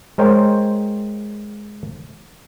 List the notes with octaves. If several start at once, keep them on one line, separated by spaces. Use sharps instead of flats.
G#3 A#4 C5 C#5 G5